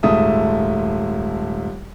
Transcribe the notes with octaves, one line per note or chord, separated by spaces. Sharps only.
D#1 G#2 A3 G#4 E5 D#6